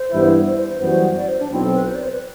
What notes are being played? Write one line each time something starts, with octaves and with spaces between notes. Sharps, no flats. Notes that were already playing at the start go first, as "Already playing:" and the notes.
Already playing: C5
G2 E3 B3 E4
C5
C5
C5
F#2 E3 G3 B3 F#4 C5
D5
C5
D4
B1 B2 F#3 C4 E4
A4
B4
C5
D5
C5
B4